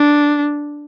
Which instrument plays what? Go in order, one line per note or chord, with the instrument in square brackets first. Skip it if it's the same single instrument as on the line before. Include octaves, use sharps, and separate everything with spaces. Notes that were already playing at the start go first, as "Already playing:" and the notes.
Already playing: [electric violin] D4